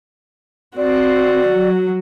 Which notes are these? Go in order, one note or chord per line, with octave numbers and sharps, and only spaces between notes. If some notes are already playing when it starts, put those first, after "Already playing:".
C4 F#4 D5
F#3